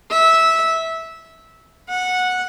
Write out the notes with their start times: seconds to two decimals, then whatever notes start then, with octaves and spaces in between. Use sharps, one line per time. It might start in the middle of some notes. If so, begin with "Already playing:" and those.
0.11 E5
1.89 F#5